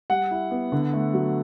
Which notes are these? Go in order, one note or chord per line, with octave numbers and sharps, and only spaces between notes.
G3 F#5
E4
B3
D3
A3
F#3